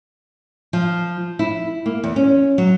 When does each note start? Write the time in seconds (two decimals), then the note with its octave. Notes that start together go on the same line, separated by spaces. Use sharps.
0.73 F3
1.39 E4
1.86 A#3
2.04 E2
2.16 C#4
2.58 F#3